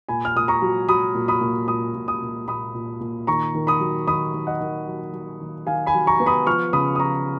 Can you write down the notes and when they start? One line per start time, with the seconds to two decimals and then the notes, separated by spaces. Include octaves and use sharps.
0.09 A#2 G#5 B5
0.25 F6
0.35 A#2 D#6
0.48 A#5 C#6
0.62 F#3
0.88 F#3 B5 D#6
1.15 A#2
1.28 B5 D#6
1.41 A#2
1.68 A#2 B5 D#6
1.94 A#2
2.08 B5 D#6
2.21 A#2
2.48 A#2 B5 D#6
2.74 A#2
3.01 A#2
3.27 D#3 A#5 C#6
3.55 D#3
3.67 B5 D#6
3.80 F#3
4.07 D#3 B5 D#6
4.34 D#3
4.47 D#5 F#5
4.61 D#3
4.87 F#3
5.13 F#3
5.40 D#3
5.67 D#3 F5 G#5
5.86 G#5 B5
5.94 F#3
6.07 A#5 C#6
6.20 B3
6.26 B5 D#6
6.47 F3 C#6 F6
6.73 C#3 B5 D#6
6.95 D#6
7.00 F3 A#5 C#6